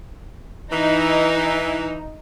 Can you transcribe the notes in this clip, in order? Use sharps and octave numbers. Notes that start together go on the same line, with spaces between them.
E3 D#4